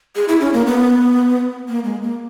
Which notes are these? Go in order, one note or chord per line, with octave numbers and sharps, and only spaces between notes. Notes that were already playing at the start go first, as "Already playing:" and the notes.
G#4
E4
C#4
A#3
B3
A#3
G#3
A#3